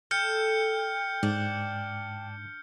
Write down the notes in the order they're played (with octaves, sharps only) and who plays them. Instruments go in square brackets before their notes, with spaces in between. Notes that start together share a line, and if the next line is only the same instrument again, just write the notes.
[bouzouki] A4 [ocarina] G5 [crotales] F6 G6 C#7
[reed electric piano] G#2 [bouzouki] D4